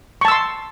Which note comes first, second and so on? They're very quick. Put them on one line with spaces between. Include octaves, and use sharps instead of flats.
C#6 A5 E6 C6